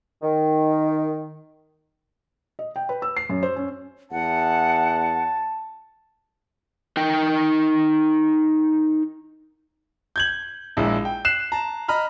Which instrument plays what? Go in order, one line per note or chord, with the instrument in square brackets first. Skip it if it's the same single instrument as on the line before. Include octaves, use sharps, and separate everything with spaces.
[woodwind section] D#3
[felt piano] D#5
G5
B4
E6
C7
F#2
C5
C#4
[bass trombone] E2 [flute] F#5 [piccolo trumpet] A5
[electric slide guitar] D#4 A#4 G5
[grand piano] G6 G#6 F#7
A#1 G#3 E4
G5
F#6 C7 E7
A5 A#5
D#5 A#5 B5 F6